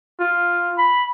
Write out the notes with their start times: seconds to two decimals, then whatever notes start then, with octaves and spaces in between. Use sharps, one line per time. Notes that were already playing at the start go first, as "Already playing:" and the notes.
0.19 F4
0.78 B5